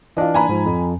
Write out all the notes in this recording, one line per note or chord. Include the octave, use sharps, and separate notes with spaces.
E3 D4 F4 D#5
G#5 A#5 B5
G#2 F3
F2